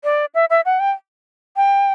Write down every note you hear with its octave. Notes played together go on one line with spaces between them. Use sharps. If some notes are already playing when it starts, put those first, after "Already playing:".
D5
E5
E5
F#5
G5
G5